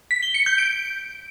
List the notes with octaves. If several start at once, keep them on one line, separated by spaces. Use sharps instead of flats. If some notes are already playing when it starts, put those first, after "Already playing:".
B6
G7
C#7
G6
D7